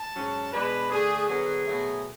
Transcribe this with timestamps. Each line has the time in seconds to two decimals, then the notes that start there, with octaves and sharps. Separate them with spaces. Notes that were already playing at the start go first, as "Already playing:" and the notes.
Already playing: A5
0.14 G#2 F#3 C#4
0.52 B2 G#3 D4 B4
0.90 D3 A3 D4 G#4
1.28 D3 F#3 B3 G#4
1.66 B2 F#3 A3